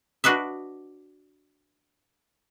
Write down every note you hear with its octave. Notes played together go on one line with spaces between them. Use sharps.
D4 F#4 B4 D#5 E5